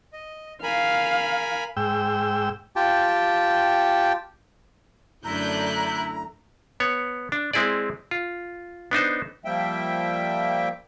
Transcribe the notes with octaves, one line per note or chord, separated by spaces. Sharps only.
D#5
A#4 F5 G#5 B5
G#2 G5 E6
F4 G4 G5 A5
F#2 D3 A3 D4 E4 A#5 F#6 G6
B3 C#5
D4
G#3 C4 E4 G#4 D5
F4
B3 D4 D#4 C5
F3 G3 A#3 E5 G5